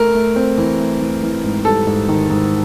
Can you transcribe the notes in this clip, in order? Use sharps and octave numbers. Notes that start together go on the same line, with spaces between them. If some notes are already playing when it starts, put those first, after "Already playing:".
Already playing: A3 A#4
A3
C4
E3
A3
E3
E3
G#2
G3 A4
G#2
D#3
G#2